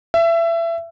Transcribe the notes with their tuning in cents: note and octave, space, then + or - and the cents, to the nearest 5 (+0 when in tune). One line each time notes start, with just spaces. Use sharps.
E5 +25